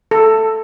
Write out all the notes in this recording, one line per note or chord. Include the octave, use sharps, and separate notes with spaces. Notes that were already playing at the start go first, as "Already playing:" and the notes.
A4